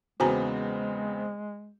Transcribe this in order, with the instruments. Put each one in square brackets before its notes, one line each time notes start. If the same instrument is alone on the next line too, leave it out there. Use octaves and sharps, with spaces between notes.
[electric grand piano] E2 C#3 B3 [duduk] G#3 [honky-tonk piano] C4 [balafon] F#4 G#5 A#5